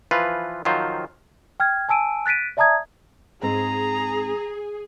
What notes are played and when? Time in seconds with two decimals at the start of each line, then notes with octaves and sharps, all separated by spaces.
0.11 E3 F3 F4 B4
0.65 D#3 F3 F#3 F4 C5
1.60 G5 F6 G#6
1.89 G#5 A5 E6 D7 D#7
2.26 F#6 A6 B6 D7 D#7
2.57 D5 E5 A5 A#5 D#6 G#6
3.42 G#2 C4 G#4 A#5